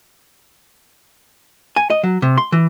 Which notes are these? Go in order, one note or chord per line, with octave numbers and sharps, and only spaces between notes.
G#5
D#5
F#3
C3
C6
E3